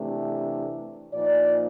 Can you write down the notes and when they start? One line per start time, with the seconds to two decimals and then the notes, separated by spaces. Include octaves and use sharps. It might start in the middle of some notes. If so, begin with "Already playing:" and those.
Already playing: C3 E3 A3 D4
1.13 A#2 F3 A#3 D#4 D5